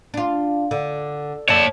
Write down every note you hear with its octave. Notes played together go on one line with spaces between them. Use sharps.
D4 F4
D3
C#5 D5 E5 A5